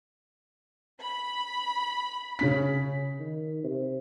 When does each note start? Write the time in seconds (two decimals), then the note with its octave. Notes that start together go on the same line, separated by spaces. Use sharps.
1.00 B5
2.39 C#3 C#4 B6
3.20 D#3
3.64 C3